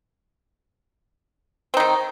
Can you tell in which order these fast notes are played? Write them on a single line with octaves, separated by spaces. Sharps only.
C4 D#4 D#3